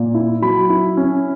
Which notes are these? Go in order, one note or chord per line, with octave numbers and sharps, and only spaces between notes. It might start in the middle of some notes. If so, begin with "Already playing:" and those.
Already playing: A#2
E4
F#3 B5
E4
C#4